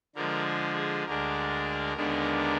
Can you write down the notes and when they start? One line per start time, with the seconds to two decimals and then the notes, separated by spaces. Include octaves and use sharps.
0.15 D3 F3 G#3 A#4
0.46 G#4
0.76 G#4
1.06 D2 D3 G#3 D4 A#4
1.96 D#2 D3 G#3 B3 D4